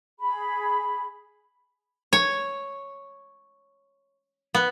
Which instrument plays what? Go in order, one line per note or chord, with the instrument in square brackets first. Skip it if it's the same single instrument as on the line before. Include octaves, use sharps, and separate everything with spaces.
[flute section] G#4 B5
[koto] C#5
B3